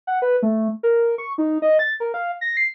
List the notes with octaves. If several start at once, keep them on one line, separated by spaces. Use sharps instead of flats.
F#5
B4
A3
A#4
C#6
D#4
D#5
A6
A#4
F5
A#6
C7